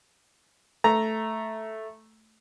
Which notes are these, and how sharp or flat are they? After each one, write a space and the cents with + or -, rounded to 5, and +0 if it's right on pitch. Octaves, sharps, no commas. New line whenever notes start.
A3 +0 A#5 +0